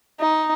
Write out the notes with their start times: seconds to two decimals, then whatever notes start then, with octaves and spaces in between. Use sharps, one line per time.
0.20 D#4